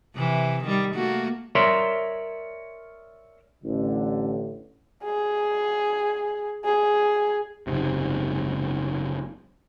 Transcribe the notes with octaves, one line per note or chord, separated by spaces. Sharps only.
C3 E3
D#3 G3
A3 A#3 F#4
A#4 C#5 D5 E5 A#5 C6
A1 D3
G#4
G#4
F#1 C#2 G#2 C3